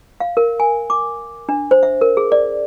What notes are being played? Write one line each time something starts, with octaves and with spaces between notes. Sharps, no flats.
F5
A#4
G#5
D6
D4
C5
E5
A#4
G#4
D5